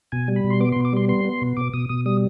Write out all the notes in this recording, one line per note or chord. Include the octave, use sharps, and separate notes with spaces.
B2 G#5
G3
B5
B2
C6
B3 D6
C6
B2
D6
G3 C6
B3 C6
B3
B2
B2 D6
B2 D#6
B2 D#6
G3 D#6